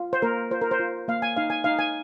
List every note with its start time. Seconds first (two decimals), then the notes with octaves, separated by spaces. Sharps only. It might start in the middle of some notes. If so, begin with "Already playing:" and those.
Already playing: F4
0.13 C5
0.22 A#3 A#4
0.51 F4 C5
0.61 A#4
0.71 C5
0.79 F4
1.08 A#3 F5
1.22 G#5
1.37 D#4 F5
1.50 G#5
1.64 D#4 F5
1.79 G#5